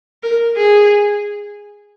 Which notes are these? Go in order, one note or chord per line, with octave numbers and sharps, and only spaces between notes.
A#4
G#4